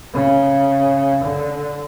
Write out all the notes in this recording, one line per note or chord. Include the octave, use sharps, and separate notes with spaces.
C#3
D3